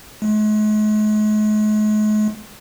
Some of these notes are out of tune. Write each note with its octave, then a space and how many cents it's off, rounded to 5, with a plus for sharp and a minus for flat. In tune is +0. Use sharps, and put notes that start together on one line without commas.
G#3 +45